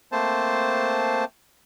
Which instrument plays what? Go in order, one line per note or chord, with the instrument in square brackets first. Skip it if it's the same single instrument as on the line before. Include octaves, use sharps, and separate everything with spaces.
[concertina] A3 A#3 C4 C5 A5